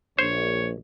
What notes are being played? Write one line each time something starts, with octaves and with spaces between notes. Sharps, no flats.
A#1 C5 C#5